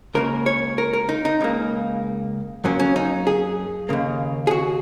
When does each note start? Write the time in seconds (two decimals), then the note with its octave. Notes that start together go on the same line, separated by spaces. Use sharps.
0.14 C#2 C#3 A#3 A#4
0.46 C#5
0.78 A#4
0.93 A#4
1.09 D#4
1.25 D#4
1.41 C#2 C#3 A#3
2.64 F#2 F#3 A#3 C#4
2.79 C#4
2.96 D#4
3.27 G#4
3.89 D#2 C#3 A#3
4.47 G#4
4.51 F#4